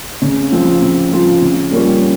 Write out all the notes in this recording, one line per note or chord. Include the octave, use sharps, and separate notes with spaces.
C#3
F3 C4 F4
C#3
F3 C4 F4
C#3
G3 A#3 C#4 F4